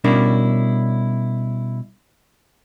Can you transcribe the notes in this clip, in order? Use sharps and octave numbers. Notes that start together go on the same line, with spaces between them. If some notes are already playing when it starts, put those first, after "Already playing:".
B2 G3 C#4 D4 E4 A#4